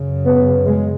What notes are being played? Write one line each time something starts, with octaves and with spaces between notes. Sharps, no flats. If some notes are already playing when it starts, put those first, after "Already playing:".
Already playing: F#2 C#3
B3
G#3